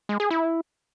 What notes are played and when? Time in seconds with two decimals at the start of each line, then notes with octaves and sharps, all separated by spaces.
0.09 G#3
0.20 G#4
0.31 E4